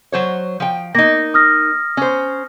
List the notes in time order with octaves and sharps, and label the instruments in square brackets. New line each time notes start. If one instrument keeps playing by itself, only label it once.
[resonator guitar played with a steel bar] F#3 C5 C#5
F3 G5
[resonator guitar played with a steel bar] A#3 D#4 [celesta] A#6
[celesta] D#6 F6 A#6
[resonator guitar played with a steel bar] C#4 C5